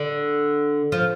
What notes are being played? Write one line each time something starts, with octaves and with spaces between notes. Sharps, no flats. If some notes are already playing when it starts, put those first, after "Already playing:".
Already playing: D3
F3